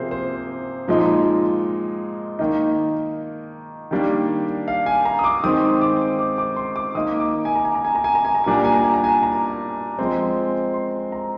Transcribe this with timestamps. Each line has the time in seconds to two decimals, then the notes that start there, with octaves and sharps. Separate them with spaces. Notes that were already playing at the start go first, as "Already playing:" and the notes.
Already playing: C3 F3 A#3 G#4 C5
0.11 C5
0.88 A#2 F3 G#3 D#4
2.39 D#3 A#3 D#4
3.91 D#3 G3 A#3 D4
4.68 F5
4.86 G#5
5.05 A#5
5.19 D#6
5.24 D6
5.44 D#3 G#3 C4 D#6
5.81 D6
6.19 D6
6.38 D6
6.56 C6
6.76 D6
6.95 D#3 A#3 D#4 D#6
7.20 D6
7.45 G#5
7.56 A#5
7.65 G#5
7.75 A#5
7.85 G#5
7.95 A#5
8.04 G#5
8.15 A#5
8.25 G#5
8.35 A#5
8.44 A#2 G3 A#3 D4 G#5
8.54 A#5
8.65 G#5
8.74 A#5
8.84 G#5
8.94 A#5
9.04 G#5
9.23 A#5
9.99 F3 G#3 C4
10.74 C6
11.12 A#5